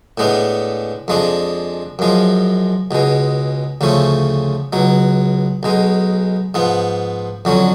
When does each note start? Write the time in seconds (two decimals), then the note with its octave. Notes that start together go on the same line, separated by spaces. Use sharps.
0.18 A2 G#3 B3 D4
1.08 F2 F3 G#3 D4
1.99 F#2 F3 G#3
2.91 C#2 B2 G#3
3.81 D2 C#3 F3 A3 C#4
4.73 C#2 B2 F#3
5.63 B1 B2 G#3
6.54 G#2 F3 B3
7.45 F2 D3 F#3 C#4